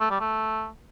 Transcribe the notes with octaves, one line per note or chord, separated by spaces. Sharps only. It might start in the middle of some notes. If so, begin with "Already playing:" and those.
A3
G3
A3